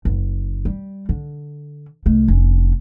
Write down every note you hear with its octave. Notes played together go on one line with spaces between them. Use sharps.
F#1
G3
D3
C2 A3
F1 C#4